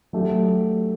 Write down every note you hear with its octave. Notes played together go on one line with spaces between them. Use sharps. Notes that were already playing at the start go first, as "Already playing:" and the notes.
F#3 A3 D4 G4